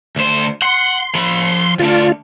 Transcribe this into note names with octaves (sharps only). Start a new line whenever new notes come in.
D2 C5
F#5 C6
F3 B5
D2 D4 F4